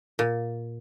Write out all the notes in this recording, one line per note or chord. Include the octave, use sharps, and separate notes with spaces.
A#2